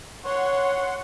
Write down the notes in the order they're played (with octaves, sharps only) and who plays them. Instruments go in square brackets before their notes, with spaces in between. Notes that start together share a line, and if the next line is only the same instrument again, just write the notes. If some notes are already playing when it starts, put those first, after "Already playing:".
[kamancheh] C#5 [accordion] F#5 C6